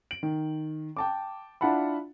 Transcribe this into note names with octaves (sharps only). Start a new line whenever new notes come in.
D7 F#7
D#3
G5 A5 D6
D4 E4 F4 F#5 A5 B5